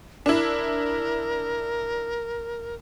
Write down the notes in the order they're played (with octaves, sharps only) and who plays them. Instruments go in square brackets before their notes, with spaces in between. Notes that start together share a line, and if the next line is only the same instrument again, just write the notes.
[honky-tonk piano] D4 E4 [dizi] A#4